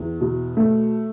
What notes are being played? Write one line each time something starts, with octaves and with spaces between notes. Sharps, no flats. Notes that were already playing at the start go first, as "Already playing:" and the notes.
Already playing: E2
B2
A3